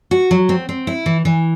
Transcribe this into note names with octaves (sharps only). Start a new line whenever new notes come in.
F#4
F#3
C4
C4
E4
E3
E3